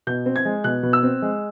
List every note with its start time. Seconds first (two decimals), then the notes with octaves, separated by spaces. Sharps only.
0.07 B2 G6
0.26 C4
0.36 G#6
0.45 G#3
0.64 B2 F#6
0.83 B2
0.93 E6
1.03 C4
1.22 G#3